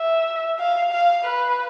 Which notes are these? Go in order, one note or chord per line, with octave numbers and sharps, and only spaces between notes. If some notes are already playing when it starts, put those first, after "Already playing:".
Already playing: E5
F5
F5
B4